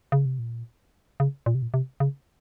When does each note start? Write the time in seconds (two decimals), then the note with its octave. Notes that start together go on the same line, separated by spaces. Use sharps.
0.12 C#3
0.25 C3
0.39 A#2
1.20 C#3
1.46 A#2
1.55 C3
1.62 A#2
1.74 C3
2.00 C#3